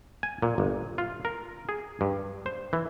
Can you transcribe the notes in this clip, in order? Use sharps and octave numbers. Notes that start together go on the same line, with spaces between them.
G#5
A#2
G1
F4
A#4
G#4
G2
C5
E3